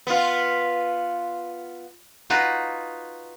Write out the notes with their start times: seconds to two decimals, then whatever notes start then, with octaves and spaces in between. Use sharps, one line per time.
0.07 B3 F4
2.30 D#4 F4 F#4 B4